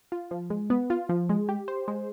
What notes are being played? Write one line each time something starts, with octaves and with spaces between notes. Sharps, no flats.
F4
F3
G#3
B3
F4
F3
G#3
G4
C5
G#3